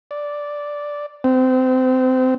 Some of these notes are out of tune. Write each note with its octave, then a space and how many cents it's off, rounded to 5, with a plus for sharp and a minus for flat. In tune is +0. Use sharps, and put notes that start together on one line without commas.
D5 -5
C4 -25